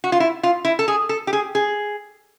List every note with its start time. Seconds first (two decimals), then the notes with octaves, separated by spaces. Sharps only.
0.04 F#4
0.12 F4
0.20 E4
0.43 F4
0.65 E4
0.79 A4
0.88 G#4
1.09 A4
1.27 G4
1.33 G#4
1.55 G#4